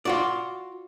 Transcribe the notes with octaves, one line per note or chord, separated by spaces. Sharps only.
F4 F#4 D5